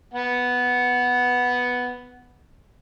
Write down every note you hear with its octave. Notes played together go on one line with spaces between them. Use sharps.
B3 F#5